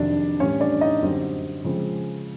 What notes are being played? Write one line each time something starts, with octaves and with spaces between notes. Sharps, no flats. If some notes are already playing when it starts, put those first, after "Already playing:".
Already playing: F2 C3 D#3 F#3 D4 D5
A2 E3 G3 C#4 C#5
D4 D5
D#4 D#5
F#2 D3 G3 C4
C#3 F3 G#3 C4